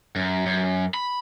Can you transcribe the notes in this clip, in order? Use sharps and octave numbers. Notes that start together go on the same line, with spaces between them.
F#2
F#2
B5